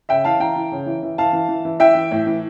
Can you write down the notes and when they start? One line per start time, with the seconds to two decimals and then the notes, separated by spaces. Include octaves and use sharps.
0.09 C#3 E5 G5
0.24 E3 F5 A5
0.40 E3 G5 A#5
0.56 E3
0.72 C#3
0.86 E3
1.03 E3
1.18 E3 F5 A5
1.33 E3
1.48 E3
1.65 E3
1.80 E3 E5 G5
1.95 E3
2.11 A2
2.27 E3